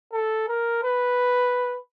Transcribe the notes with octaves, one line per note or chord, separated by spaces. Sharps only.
A4
A#4
B4